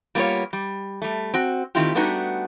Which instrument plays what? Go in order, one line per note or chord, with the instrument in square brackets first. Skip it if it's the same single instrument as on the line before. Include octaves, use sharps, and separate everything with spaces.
[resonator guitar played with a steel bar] G3 A#3 B3 D#4 F4 C#5
G3
G3 A3
C4 F#4
D#3 A3 C4 E4 F4 G4
G3 A3 B3 D4 D#4 F#4